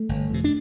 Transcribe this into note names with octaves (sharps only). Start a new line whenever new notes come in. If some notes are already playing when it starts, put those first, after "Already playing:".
Already playing: A3
G1
F2 C3
D4